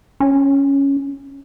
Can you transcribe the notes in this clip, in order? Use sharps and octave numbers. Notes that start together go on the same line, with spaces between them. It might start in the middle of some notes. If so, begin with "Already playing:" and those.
C#4